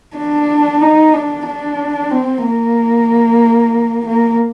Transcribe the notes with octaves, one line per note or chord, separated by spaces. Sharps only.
D4
D#4
D4
D4
C4
A#3
A#3